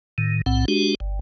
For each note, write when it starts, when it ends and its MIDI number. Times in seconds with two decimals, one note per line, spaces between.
0.18 0.41 45
0.18 0.41 51
0.46 0.65 35
0.46 0.65 45
0.46 0.65 60
0.46 0.65 78
0.68 0.95 56
0.68 0.95 62
0.68 0.95 66
0.68 0.95 67
1.00 1.19 31